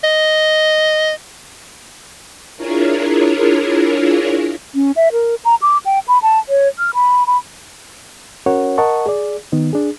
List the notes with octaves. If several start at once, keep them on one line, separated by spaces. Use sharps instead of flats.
D#5
D4 E4 F4 G#4 A#4 C#5
C#4
E5
A#4
A#5
D6
G5
B5
A5
C#5
F6
B5
B5
C#4 F#4 A#4 C#5 F#5
A#4 D#5 F#5 A5 C#6
G#4 D5
D#3 B3 D#4
D4 G#4